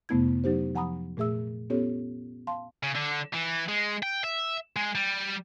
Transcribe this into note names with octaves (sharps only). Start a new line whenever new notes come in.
F2 C3 A3 B3 E4 G#6
F#3 D#4 G4 C5
F3 F#5 G#5 A#5 B5 D#6
A#2 A3 G#4 E5 E6
B3 C#4 F4 G4 A4 C#5
F5 A5 C6
C#3
D3
E3
G#3
G5
E5
G#3
G3